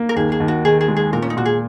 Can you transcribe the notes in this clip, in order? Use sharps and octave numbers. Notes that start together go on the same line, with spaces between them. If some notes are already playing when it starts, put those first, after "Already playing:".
Already playing: A#3
A#4
D#2 G#4
G#4
D#2
F#4
D#3 G#4
G#4
G#3
G#4
A#2 A#4
C#4
D#4
A#2 F#4
G#4